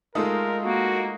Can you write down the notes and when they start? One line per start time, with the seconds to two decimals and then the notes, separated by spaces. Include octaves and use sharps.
0.15 G#3 A3 D#4 F4 A4 A#4 D#6
0.63 A#3 F#4